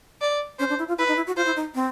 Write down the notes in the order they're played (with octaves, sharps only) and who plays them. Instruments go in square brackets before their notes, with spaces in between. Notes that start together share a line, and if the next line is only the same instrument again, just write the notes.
[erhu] D5
[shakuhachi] C#4 [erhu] C5
[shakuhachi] D4
E4
F4
[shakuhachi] E4 [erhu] B4
[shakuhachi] D#4
E4
F#4
[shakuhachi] F4 [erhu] C5
[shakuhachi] E4
D#4
C4